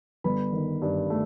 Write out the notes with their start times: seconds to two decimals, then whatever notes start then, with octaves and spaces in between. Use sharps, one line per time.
0.24 G1 B4 B5
0.53 D#3
0.82 G2
1.10 A3